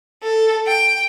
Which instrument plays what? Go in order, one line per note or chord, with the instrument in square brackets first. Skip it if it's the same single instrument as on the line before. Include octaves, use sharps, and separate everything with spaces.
[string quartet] A4
G5